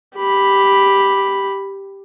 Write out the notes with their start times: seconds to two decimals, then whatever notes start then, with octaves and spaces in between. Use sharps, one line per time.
0.16 G4 B5